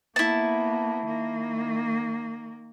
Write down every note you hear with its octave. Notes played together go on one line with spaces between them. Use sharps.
A#3 B3 E4 A5
D#3 A#3